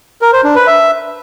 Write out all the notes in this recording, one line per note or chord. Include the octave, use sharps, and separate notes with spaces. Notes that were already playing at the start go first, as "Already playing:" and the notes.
A#4
C5
D4
B4
E5